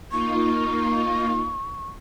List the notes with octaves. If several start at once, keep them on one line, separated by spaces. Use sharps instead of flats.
A#3 D#4 F4 C#6